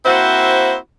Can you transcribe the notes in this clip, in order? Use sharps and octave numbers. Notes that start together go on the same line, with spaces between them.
A#3 C4 E4 F#4 C5